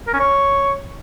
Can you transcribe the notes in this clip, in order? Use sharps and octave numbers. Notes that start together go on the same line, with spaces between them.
A#4
C#4
C#5